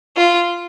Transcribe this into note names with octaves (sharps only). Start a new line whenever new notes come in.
F4